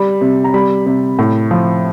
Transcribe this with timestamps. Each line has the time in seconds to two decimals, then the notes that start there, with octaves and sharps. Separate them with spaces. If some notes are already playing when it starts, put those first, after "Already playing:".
Already playing: G3 B5
0.21 C3
0.44 A#5
0.54 G3 B5
0.86 C3
1.19 A2
1.51 F3